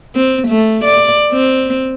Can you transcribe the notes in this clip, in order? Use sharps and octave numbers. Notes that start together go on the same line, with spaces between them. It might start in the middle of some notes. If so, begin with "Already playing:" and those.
C4
A3
D5
C4